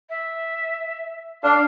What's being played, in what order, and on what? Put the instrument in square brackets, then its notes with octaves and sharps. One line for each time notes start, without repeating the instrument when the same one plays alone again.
[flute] E5
[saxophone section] D4 [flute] F5